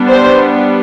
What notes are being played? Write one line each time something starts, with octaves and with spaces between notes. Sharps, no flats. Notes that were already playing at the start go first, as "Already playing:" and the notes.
Already playing: G3 B3 D4
C5